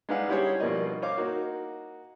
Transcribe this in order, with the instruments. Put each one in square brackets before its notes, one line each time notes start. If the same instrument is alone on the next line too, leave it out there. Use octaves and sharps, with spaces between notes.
[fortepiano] G#3 D4 D#4 B4 F5 F#5
G3 E4 G4 G#4 C5 C#5
G2 B2 F3 A#3 D5 D#5
C5 C#5 D#5 F5 D6
A#3 D#4 F#4